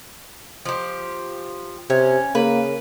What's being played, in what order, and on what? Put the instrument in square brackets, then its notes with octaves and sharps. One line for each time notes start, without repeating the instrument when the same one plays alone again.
[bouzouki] F3 G4
[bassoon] C3 [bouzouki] C#4
[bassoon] C#3 [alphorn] A#3 [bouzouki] B4